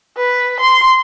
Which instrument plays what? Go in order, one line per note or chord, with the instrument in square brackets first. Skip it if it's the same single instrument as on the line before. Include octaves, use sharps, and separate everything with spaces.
[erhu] B4
C6